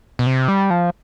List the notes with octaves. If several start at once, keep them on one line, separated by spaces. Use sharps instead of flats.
B2
C3
G3
F3